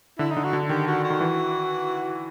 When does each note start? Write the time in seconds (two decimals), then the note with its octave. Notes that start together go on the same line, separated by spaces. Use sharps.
0.19 D3 E4
0.32 D3 D#4
0.45 F#4
0.53 D3
0.69 D#3 G4
0.87 F#4
1.04 F#4
1.10 D#3
1.20 E3